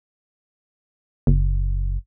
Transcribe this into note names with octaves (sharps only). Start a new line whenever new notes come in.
F#1